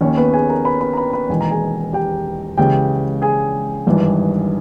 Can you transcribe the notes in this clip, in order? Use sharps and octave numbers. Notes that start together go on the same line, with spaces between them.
D#2 D#3 C#4 C#5
B3 B4
G#4 G#5
A#4 A#5
B4 B5
B4 B5
A#5
B4 B5
B4 B5
E1 E2 D#3 G#5
A#5
G#4 G#5
G4 G5
C#2 C#3 E3 G4 G5
G#4 G#5
G#1 G2 E3